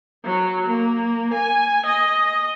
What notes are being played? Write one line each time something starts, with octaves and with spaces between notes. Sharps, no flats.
F#3
A#3
G#5
D#5